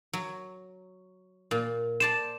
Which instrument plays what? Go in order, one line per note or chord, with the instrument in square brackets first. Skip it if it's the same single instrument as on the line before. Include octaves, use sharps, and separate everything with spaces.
[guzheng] F#3
A#2
[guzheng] C5 D5 A5 [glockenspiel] E7